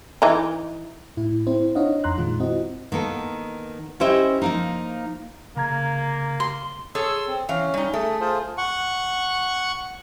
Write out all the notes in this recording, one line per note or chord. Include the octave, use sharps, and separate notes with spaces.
E3 D#4
A2 E4
C4 E4 C5
D4 D#4 C#5 D#5 F5 F#5
F2 A#5 C6 F#6
A#2 D#3 G#3 F4
C4 E4 F#4 D#5
D#3 A#3 B3 A4
C#4 E4 G4 C5 D#5 E5
F3 A#3 D#4
C#3 A#3 A#5 G#6
C6
G#4 A4 C#5 C6 E6
C4
E3 C#4 F5
G3 D#4
A3 G#4
F4 G#4 C5
F#5 C#6